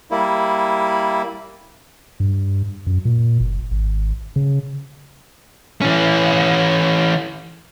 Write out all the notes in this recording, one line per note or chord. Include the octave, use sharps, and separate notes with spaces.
G3 A#3 E4
G2
F#2
A#2
F#1
G#1
C#3
E3 C#4